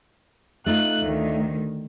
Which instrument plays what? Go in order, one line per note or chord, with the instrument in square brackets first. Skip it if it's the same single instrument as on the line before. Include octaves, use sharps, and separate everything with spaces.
[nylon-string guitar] A3 D#4 F4 [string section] F#6
[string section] D2 D#3